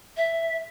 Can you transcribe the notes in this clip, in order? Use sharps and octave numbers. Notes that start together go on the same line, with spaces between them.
E5